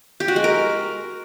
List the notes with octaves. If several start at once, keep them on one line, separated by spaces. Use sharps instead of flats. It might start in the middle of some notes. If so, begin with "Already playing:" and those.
G4
F#4
G#3
A#4